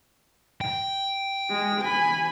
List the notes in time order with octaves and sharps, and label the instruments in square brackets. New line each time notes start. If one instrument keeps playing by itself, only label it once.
[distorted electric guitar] G5
[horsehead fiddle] G#3
G#5 B5